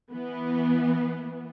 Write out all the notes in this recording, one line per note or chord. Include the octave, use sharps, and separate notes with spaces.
E3 B3